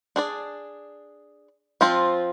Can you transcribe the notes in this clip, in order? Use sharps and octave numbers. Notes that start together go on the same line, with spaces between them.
D4 G#4 D5
F3 C4 F4